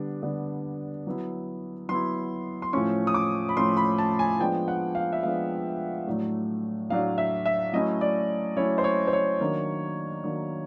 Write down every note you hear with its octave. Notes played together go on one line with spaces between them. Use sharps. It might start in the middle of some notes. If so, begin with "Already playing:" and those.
Already playing: D3 G3 B3 D4
D3 G3 B3 D4
F#3 B3 E4
F#3 B3 E4 C6
C6
A2 F3 A3 C#4 C#6
D#6
D6
B5
A2 F3 A3 C#4 C6
B5
A5
G#5
F3 G#3 B3 D4 G5
F#5
F5
E5
F3 G#3 B3 D4 F5
A2 F#3 A3 D4
A2 F#3 A3 D4 F5
E5
E5
F#3 A3 C#4 E4 D#5
D5
F#3 A3 C#4 E4 C#5
C5
C#5
C5
C#5
D#3 F#3 A#3 D4
D#3 F#3 A#3 D4